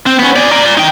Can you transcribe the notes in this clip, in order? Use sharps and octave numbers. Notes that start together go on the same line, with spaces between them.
C4
B3 C#4
G#4 D5
A#4 D5
D5 G#5
D#4 G5